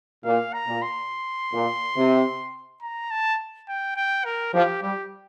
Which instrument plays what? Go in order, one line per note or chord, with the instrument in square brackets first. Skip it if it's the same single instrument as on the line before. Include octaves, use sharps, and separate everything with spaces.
[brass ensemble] A#2 [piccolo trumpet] F5
[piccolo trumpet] A#5
[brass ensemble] A#2
[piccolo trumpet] C6
[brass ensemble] A#2
C3
[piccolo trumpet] A#5
A5
G5
G5
A#4
[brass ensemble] F3 [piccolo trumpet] G4
[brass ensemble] G3 [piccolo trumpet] G4